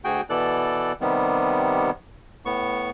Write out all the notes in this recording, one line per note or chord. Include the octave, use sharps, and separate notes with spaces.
D2 F#4 G#4 G5
B2 E3 A4 D5 F#6
C3 D#3 G3 B3
A2 B3 C#6